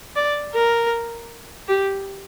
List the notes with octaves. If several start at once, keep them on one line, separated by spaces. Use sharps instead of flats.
D5
A#4
G4